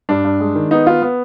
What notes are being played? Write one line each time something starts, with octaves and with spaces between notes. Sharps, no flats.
G2 D4
G2
G#3
D#3
B3 D#4
B3 F4
B3